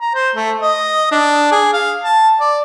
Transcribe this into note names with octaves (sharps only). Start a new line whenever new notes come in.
A#5
C5
A3
D#5
D4
G#4
F5
A5
D5